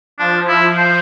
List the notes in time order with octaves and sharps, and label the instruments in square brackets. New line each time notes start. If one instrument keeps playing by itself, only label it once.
[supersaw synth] F3 [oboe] D4
[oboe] E4
C5